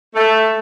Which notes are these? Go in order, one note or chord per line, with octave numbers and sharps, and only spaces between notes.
A3